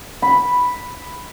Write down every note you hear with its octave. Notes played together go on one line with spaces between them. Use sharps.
B5